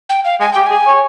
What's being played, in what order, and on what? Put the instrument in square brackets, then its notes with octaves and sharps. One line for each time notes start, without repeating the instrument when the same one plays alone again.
[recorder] G5
F5
[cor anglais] G#3 [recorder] G#5
[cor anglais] G4 [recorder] G5
[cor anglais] G#4 [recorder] G#5
[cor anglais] C#5